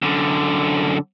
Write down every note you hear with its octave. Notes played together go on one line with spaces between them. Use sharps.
F#2 D3